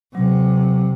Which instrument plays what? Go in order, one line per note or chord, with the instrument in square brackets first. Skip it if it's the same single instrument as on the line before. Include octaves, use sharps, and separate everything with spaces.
[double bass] C3 [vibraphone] F#3